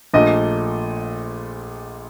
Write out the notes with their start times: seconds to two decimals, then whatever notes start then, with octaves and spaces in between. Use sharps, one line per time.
0.14 A#1 A#2 A3 D#5